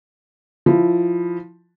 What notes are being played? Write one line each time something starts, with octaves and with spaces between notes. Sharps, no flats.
F3 E4